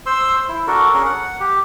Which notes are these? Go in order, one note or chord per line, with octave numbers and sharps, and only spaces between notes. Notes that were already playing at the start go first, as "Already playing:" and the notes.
C5 C6 E6
E4
D4 F#4 A4 A#4
C#4 G#4 A#4
F#5
G4